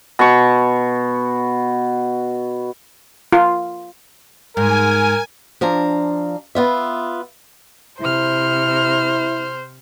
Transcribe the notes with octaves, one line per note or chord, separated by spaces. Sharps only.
B2 C#6
F4
G#2 A#4 G#5
F3 D4 F5 A#5
B3 F4 E5
C3 E4 C5 F6